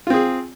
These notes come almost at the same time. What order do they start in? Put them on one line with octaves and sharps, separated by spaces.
F4 C4 G#4